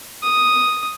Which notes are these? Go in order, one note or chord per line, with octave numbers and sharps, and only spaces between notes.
D#6